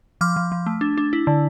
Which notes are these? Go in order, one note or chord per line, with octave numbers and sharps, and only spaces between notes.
F3 D6 F6
F3
F3
A3
D4
D4
E4
D3